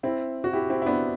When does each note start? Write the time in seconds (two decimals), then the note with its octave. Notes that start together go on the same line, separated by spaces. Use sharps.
0.03 C4 E4
0.44 F#4
0.53 E4 G4
0.70 C4 E4
0.82 E4
0.86 B3 D4